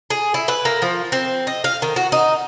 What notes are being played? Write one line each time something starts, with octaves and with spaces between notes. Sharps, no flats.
G#4
E4
B4
A#3
F3
C4
D#5
F5
D#3
F#4
D#4